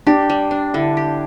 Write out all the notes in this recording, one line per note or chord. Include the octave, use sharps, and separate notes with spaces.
D4 G4
G3
D4
D3 E4
G4